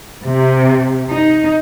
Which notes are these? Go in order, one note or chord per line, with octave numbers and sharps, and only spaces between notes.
C3
D#4